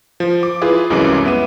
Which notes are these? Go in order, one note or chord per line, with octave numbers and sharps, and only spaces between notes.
F3
D6
E4 F4 G#4 B4
C2 F#2 E3 G#3 C#4 D6
B3 E5 D#7